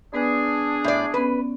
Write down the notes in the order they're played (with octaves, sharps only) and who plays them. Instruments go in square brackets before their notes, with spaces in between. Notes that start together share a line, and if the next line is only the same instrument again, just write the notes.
[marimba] B3 B4 G#5 [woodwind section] D4 G#4
[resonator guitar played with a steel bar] A2 D5
[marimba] B3 C#4 [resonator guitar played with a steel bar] B4